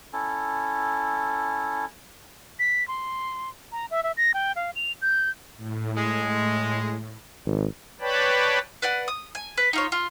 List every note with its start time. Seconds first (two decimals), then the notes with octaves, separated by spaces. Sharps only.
0.13 C#4 E4 A4
2.59 B6
2.88 C6
3.72 A#5
3.91 E5
4.03 E5
4.17 A#6
4.34 G5
4.56 F5
4.76 F7
5.02 G6
5.57 A2
5.97 G#3
7.46 G#1
8.01 B4 C#5 D5 G5 A5 B5
8.82 B4 D5 F#5
9.08 D#6
9.35 G#5
9.57 B4
9.73 D#4 F4 C#5
9.92 F4